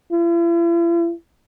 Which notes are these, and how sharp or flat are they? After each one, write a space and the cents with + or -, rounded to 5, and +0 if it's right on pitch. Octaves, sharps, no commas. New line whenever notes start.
E4 +45